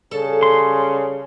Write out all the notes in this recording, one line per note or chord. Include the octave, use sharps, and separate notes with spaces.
C#3 G3 C#4 A4 A5
C6